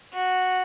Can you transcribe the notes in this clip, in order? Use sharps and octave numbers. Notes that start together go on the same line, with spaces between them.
F#4